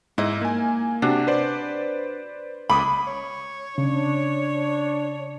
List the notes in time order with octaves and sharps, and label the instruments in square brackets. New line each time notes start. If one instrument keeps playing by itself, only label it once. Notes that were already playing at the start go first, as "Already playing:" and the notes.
[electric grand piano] G#2 [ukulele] E4 D#5
[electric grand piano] A#3 G#5
[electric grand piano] C3 [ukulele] D4 F#4
[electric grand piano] B4 C5 D5
[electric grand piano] C#2 D6 D#6 [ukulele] B5
[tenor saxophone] C#5
[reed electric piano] C#3 [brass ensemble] D4